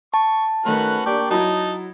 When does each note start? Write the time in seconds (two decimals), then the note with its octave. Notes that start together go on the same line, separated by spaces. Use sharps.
0.14 A5 C#6
0.65 D#3 A3 C#4 F#4 B4
1.06 A#3 D4 G4 D5 G5 C#6
1.31 F#3 D#4 E4 A5